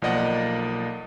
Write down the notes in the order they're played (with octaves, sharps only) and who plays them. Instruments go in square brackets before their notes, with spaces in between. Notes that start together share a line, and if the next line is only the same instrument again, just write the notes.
[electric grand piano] B1 F3 A#3 D5 D#5 F#5